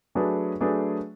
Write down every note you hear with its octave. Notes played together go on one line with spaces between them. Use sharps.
F#3 A3 D4 G#4 B4
F#3 A3 D4 G#4 B4